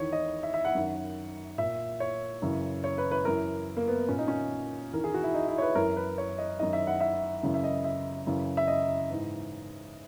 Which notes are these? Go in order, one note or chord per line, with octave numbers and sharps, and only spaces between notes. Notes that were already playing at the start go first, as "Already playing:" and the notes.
Already playing: E2 D#3 C#5
D#5
E5
E5
F#5
F#2 D#3
A#2 E5
C#5
F#2 C#3 E3
C#5
B4
B4
F#2 E3 A#4
A#3
B3
A#2 C#4
D#4
C#4
E2 D#3 A#4
G#4
F#4
E4
D#4
E4
C#5
B4
F#2 E3 A#4
B4
C#5
D#5
F#2 D#3 D#5
E5
F#5
E5
F#2 C#3 E3
E5
D#5
E5
F#2 C#3 E3
E5
D#5
G#2 E3